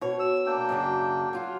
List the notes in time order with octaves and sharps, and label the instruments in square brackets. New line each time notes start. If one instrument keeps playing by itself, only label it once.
[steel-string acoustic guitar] B2 C#5
[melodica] E6
A#3 D4 G5
[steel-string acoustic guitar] F#2 A2 C#3
F#3 F4